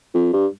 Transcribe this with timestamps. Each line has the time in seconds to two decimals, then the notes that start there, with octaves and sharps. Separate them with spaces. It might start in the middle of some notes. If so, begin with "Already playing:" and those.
0.14 F2
0.33 G2